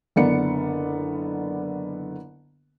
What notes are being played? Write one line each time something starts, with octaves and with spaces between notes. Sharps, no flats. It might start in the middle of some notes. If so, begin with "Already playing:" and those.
F#1 D3 B3 D5 C#7